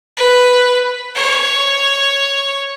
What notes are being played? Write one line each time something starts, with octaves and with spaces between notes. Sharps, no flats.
B4
C#5